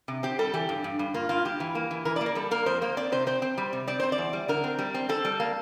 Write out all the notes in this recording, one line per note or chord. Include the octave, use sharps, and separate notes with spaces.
C3
C4 G4
G3 A4
E3 G4
G2
G2
G2
A#3 F4
G2 F4
G2 G4
E3
A#3
E3
E3 A#4
D5
A#3
A#4
G3 A4
A#3 A#4
F2 C5
A#3 C5
C4 D5
C3 C5
C4 C5
C4
G3
C3
C4 D5
C4 C5
D5
E2
G3
D3 A#4
C4
G3
C4
C4 A4
G3
A#3